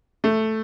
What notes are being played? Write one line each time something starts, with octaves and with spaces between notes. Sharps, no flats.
A3